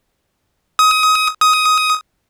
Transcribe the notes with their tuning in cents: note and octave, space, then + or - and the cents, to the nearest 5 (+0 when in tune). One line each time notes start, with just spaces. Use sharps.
D#6 +25
D#6 +15